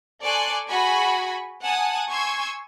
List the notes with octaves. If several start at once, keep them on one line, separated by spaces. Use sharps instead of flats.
A4 D5 G#5 C6 C#6 F#6
F#4 G#4 G#5 B5 C#6
F#5 G#5 A5 D#6
G#5 C6 C#6 E6 G#6